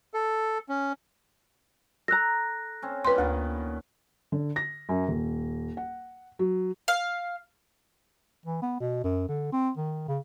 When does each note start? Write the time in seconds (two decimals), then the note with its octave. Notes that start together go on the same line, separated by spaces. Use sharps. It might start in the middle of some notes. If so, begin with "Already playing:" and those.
0.14 A4
0.69 C#4
2.08 A4 A#5 F#6 A#6
2.82 C4 C#4
3.05 A#2 G3 C#4 B4 C6
3.18 D2 A#2 D#3 B3
4.32 D3
4.56 A#6
4.89 F#2
5.08 D#1
5.77 F#5
6.39 F#3
6.88 F5
8.46 E3
8.62 B3
8.80 B2
9.04 F#2
9.28 D3
9.53 C4
9.77 D#3
10.08 C#3